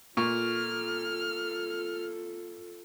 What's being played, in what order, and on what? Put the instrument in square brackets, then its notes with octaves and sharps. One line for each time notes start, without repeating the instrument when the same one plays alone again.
[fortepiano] A#2 C#6 [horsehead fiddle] F4 A4 [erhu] F6